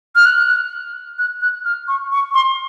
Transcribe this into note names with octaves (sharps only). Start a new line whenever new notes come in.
F6
F#6
F#6
F#6
F6
C#6
C#6
C6